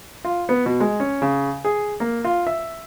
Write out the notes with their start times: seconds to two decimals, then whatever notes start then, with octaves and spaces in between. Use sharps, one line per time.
0.24 F4
0.49 B3
0.66 B2
0.80 G#3
1.00 C#4
1.22 C#3
1.65 G#4
2.00 A#3
2.24 F4
2.47 E5